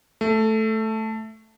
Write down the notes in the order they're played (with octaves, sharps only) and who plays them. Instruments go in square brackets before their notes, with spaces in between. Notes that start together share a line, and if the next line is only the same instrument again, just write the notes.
[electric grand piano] A3